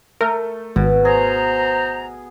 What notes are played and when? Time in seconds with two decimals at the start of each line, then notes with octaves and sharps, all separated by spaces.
0.21 A3 A#4
0.76 G#1 B2
1.05 G#4 C5 A#5